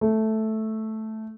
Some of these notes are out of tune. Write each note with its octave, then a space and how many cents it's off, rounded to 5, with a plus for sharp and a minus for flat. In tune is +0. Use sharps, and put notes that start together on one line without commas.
A3 -5